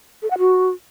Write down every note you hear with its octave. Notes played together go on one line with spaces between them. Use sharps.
A4
F#5
F#4